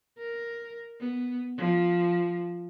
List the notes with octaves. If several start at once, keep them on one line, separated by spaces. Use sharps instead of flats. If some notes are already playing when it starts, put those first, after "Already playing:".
A#4
B3
F3